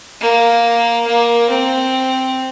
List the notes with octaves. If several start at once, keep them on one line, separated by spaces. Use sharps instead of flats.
A#3
A#3
C4